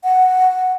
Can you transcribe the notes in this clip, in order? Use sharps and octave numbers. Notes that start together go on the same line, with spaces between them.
F#5